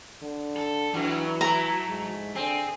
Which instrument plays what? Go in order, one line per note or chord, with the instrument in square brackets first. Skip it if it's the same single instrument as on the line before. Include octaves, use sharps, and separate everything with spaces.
[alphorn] D3
[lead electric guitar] A4
[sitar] F#2 [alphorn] E3 [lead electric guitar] F#3
[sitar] A3 E4 [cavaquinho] A#5
[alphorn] G#2
[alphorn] D3 [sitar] C4 [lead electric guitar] G#4